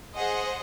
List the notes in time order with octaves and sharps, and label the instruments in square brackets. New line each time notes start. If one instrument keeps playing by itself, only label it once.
[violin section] G#4 C5 D#5 F#5